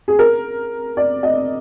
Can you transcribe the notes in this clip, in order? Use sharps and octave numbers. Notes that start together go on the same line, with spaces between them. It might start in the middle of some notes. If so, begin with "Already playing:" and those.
G#4
A#4
D5
D#5